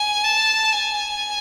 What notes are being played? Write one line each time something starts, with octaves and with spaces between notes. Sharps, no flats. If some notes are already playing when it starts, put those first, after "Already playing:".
Already playing: G#5
A5
G#5